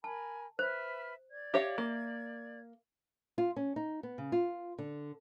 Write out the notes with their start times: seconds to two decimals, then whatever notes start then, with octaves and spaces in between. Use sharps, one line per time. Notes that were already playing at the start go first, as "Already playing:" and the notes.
0.04 A#4 G#5 A5 B5
0.59 B4 C5 E5 F6
1.30 D5 G#6
1.54 G4 C#5 E5 F5
1.78 A#3
3.38 F4
3.56 C#4
3.76 D#4
4.03 B3
4.18 C#3
4.32 F4
4.78 D3